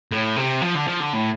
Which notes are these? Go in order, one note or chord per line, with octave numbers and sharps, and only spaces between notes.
A2
C3
F3
D3
F3
D3
A2